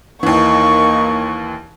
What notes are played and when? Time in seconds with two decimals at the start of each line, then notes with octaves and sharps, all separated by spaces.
0.23 D#2 E3 A#3 D#4 C#6